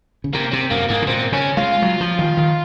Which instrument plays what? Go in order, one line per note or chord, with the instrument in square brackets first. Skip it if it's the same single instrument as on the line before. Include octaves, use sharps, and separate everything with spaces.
[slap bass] C#3
[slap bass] C3 [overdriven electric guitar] A#3
[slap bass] C3 [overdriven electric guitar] C4
[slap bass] F#2 [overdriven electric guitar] A#3
[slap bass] G#2 [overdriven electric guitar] A#3
[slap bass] C3
[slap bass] A#2 [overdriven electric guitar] C4
[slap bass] C#3 [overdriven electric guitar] C#4
[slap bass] G#3 [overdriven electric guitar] F4
[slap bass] F#3
F3
D#3
D#3